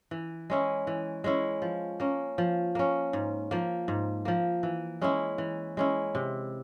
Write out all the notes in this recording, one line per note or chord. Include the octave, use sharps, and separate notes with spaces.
E3
G#3 C#4 E4
E3
G#3 C#4 E4
F3
A#3 C#4
F3
A#3 C#4
G#2
F3 A#3
G#2
F3 A#3
E3
G#3 C#4 E4
E3
G#3 C#4 E4
C3